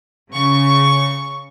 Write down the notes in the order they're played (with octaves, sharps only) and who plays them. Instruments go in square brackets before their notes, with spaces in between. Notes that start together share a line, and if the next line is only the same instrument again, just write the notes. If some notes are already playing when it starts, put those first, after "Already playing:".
[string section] C#3 C#6